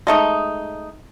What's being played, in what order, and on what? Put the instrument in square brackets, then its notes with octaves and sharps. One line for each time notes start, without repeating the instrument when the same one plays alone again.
[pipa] G#3 A3 D#4